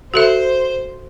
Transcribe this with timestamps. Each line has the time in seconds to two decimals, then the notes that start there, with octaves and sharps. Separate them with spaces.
0.14 F#4 A4 C5 E5